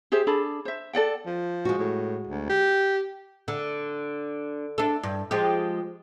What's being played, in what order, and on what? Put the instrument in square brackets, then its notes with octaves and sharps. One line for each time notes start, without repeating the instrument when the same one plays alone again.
[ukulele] G4 G#4 C5 E5
D4 G#4 A4 B5
C5 E5
A4 D5 F#5 G5
[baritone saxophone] F3
[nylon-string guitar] G#3 F#4
[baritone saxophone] A2
D2
G4
[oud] D3
D4 A4
G2
F3 G#3 G4